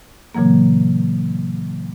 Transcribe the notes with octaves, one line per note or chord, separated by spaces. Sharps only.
A#2 C#3 E3 F#3 A#3